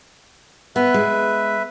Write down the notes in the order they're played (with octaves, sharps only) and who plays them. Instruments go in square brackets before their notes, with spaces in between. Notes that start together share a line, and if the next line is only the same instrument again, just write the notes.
[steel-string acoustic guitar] B3 [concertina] B4 E5
[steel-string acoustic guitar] G#3